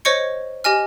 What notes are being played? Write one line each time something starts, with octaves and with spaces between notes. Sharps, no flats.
C5 C#5 D#5 C#6 G#6 C#7
G4 D#5 G#5 F6